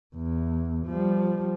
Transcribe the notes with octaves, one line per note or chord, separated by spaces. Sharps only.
E2
F3 G3